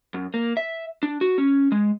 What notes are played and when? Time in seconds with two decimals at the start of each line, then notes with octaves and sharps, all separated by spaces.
0.14 F#2
0.34 A#3
0.57 E5
1.03 D4
1.21 F#4
1.38 C#4
1.72 G#3